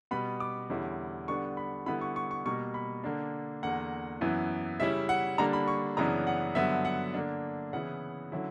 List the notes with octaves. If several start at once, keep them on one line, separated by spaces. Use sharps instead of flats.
B2 G3 B3 B5
D6
E2 D3 G3 C#4 E4
D3 G3 B3 D4 C#6
B5
D3 G3 B3 E4 B5
C#6
C#6
C#6
B2 G3 A#3 C#6
B5
D3 A#3 D4
E2 D3 A#3 F#5
F#2 E3 B3 E4
C#3 G3 C#4 E4 E5
F#5
D3 G3 A#3 D4 A#5
B5
C#6
F#2 C#3 E3 B3 D4 A#5
F#5
G2 D3 F#3 B3 E5
F#5
D3 A#3 D4
C#3 E3 B3 E4 F#5
D3 F#3 C#4 E4